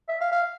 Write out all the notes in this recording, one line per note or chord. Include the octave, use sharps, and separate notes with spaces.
E5
F5
F5